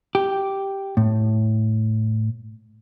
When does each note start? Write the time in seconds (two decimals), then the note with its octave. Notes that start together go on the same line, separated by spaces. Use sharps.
0.15 G4
0.97 A2